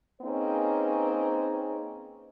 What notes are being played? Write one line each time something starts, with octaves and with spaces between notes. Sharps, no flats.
A#3 C4 C#4 D#4 G#4 B4